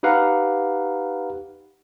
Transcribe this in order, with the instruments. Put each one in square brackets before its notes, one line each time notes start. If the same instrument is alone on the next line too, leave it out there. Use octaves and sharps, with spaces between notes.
[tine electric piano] D#4 G4 B4 F5 F#5 A#5